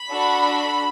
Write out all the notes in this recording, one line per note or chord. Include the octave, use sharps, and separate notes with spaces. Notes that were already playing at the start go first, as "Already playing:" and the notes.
Already playing: B5
D4 F#4 A4